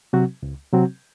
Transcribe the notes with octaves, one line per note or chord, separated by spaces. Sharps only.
C3 F#3 C4 F#4
C#2
C3 F#3 C4 F#4